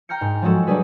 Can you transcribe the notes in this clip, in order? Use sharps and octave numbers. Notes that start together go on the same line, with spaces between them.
G5 A#5 F6 G6 C#7
G#2
F3 F#3 G#3 F#4 A4
F#3 G3 D4 G#4 B4